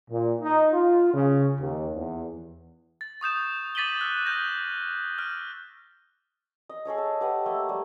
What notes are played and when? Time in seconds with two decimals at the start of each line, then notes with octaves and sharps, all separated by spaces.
0.11 A#2
0.42 D#4
0.72 F4
1.14 C#3
1.60 D#2
1.95 E2
3.01 A6
3.21 C#6 D#6 G6 E7
3.75 D6 A6 B6 D#7 F#7 G7
4.01 E6 F#6
4.26 D#6 F6 G6 A#6
5.19 F6
6.69 D#5
6.85 G#4 A4 C#5 D#5
6.98 A5
7.21 G4 B4 F#5
7.46 A3 A#3 E5
7.69 G3